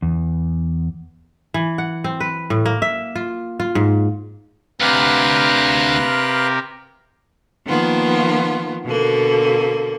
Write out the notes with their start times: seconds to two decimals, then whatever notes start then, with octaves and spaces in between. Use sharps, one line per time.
0.02 E2
1.54 E3
1.78 F#5
2.04 C4
2.20 B4
2.50 A2
2.66 A#3
2.82 E5
3.16 F4
3.60 F4
3.75 G#2
4.81 D2 C3 G4 A#4 B4 F5 F#6
7.66 D#3 F3 A#3 B3 F4
8.85 B2 D3 A#3